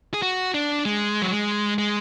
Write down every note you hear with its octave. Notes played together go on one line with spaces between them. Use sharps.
G#4
F#4
D4
G#3
F#3
G#3
G#3